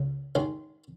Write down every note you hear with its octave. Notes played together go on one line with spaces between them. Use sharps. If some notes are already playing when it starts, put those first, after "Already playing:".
Already playing: C#2 C#3
D#2 D#3 G#3 C#4